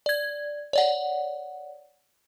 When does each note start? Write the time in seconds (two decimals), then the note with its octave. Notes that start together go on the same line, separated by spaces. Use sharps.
0.06 D5 G#6
0.73 C#5 D5 F#5